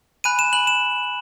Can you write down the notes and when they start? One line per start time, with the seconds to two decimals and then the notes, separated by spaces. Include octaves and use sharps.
0.24 G#5 B5 F#6 D#7
0.39 E7
0.53 G#5 B5 F#6 F#7
0.67 E7